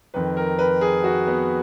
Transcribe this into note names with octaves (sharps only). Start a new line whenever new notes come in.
F2 D#3 B4
A#4
B4
G#4
F#4
B3